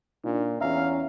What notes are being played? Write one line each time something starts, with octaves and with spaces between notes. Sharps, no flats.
A#2 D4 D#4
E2 C#4 E5 F5 A#5